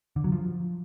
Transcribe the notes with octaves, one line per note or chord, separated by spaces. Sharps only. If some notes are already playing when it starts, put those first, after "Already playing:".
D3
F#3
F3